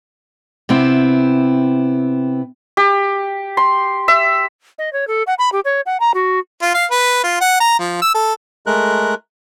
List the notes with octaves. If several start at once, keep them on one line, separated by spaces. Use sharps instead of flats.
C3 B3 C4 E4
G4
C6
E5
D#5
C#5
A4
F#5
B5
G4
C#5
F#5
A#5
F#4
F4
F5
B4
F4
F#5
A#5
F3
E6
A4
G#3 A3 A#4 F#6